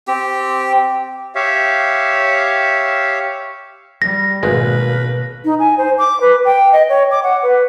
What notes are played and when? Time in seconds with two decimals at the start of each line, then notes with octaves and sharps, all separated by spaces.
0.08 C4 G4
1.35 G4 C#5 E5 F5
4.02 G3 A#6
4.43 G#1 B2 G#3 A#3 B4
5.45 D#4
5.60 G#5
5.78 C5
5.98 D6
6.21 B4
6.45 G5
6.73 D#5
6.89 C#5
7.11 D6
7.23 F#5
7.43 B4